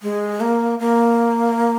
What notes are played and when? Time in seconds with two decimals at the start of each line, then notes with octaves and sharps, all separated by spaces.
0.03 G#3
0.40 A#3
0.80 A#3